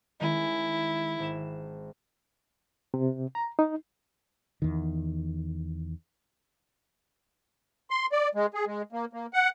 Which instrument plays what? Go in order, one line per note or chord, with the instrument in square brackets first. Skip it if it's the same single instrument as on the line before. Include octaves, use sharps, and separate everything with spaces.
[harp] D#3 G#3 C#4 [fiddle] E4
[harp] G#1 E7
[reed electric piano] C3
A#5
D#4
[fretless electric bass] E2 D#3
[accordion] C6
D5
G#3
G#4
G#3
A#3
A#3
F#5